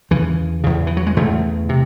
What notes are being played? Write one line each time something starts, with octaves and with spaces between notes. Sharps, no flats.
E2 C#3 E3
E2 C#3
E3
F#3
G#3
E2 C#3 A3
C3